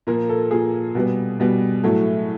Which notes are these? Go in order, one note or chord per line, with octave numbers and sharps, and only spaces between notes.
A#2 F3 A#3 A#4
A4
A#2 F3 A#3 G#4
B2 G3 B3
B2 G3 B3
A2 F#3 A3